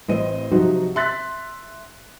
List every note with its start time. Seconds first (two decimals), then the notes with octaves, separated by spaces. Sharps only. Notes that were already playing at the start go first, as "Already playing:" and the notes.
0.08 A1 C4 B4 D#5 D#7
0.51 C3 F3 F#3 D#4 F#4
0.95 E5 C6 F#6 A6 B6